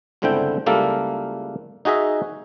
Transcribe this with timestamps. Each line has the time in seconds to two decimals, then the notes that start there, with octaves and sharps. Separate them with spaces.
0.22 G1 C#2 D3 C4 E4 G5
0.66 C#2 G3 A#3 E4 A4 A#4
1.85 D#4 F#4 G#4 D#5 E5